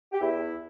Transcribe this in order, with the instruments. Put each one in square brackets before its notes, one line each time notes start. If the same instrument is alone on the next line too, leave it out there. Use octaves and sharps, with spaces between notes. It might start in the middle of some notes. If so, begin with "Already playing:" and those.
[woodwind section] G4
E2 E4